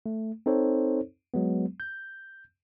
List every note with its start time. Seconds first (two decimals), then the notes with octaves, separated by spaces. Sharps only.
0.06 A3
0.46 C4 D#4 A4 C5 C#5
1.34 F#3 G#3 B3
1.80 G6